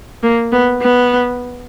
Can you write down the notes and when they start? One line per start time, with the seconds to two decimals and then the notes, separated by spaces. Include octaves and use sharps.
0.23 A#3
0.53 B3
0.82 B3